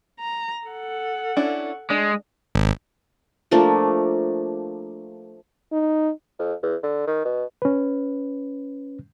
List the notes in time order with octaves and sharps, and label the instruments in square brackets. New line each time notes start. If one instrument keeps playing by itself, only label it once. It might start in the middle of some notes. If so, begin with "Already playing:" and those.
[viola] A#5
A4 F#5
[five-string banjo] C#4 D4 E4
[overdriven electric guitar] G#3 [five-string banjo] D4
[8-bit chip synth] G#1
[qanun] F3 A3 A#3 D4
[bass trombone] D#4
[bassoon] F2
E2
D3
D#3
B2
[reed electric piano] C#4 B4